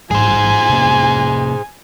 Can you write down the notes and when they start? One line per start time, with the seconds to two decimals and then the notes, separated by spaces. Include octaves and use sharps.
0.11 A1 G#2 G3 G#4 C5 G#5
0.70 C3 A#3 C#4